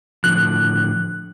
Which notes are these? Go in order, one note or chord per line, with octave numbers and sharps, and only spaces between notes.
A2 D3 F3 F#6